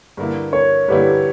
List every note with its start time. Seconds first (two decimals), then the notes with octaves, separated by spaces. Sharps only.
0.17 G2 D3 A#3 E4
0.53 A#4 C#5
0.88 G2 D3 A#3 E4 G4 B4